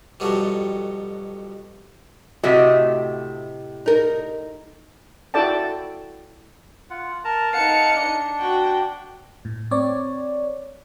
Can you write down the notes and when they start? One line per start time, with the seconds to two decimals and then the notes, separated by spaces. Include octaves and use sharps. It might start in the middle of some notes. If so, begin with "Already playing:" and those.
0.20 F2 B2 F#3 G3 A3
2.44 A2 C3 A3 F#4 D#5
3.86 D#4 A#4
5.34 E4 F#4 A4 D5 G5 A5
6.90 F4 F#5
7.25 A#4 A5 A#5
7.54 D#4 F5 F#5 A5 C#7
7.96 D4
8.40 F#4 G5
9.45 A2
9.71 C4 C#5 D5